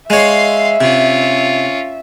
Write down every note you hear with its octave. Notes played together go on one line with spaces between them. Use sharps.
G#3 C#5 E5 F5 C6
C3 C#4 F4